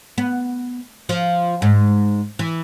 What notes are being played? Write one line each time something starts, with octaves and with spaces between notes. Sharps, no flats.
B3
F3
G#2
E3